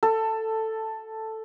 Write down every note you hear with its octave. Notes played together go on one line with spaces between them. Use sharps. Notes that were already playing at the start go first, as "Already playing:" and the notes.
A4